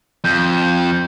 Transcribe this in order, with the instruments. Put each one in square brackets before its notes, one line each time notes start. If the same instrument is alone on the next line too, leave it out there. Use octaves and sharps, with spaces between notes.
[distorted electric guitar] F2 [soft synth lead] G6